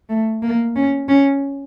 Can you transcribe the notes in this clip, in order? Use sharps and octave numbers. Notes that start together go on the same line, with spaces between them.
A3
A#3
C#4
C#4